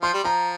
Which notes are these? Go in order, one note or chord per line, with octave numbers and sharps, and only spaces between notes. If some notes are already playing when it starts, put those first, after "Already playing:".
F3 C6
G3
F3 A#5